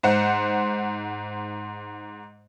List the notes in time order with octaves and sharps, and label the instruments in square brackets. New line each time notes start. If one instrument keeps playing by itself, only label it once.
[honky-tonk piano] G#2 C5 F#5